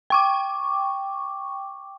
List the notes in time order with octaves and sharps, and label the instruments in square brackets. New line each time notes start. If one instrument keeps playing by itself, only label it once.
[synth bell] G5 C#6 D6